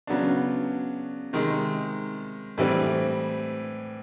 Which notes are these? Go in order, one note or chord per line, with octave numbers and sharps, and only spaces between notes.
C#3 F#3 B3 D4
C3 D#3 G#3
A2 E3 G3 C4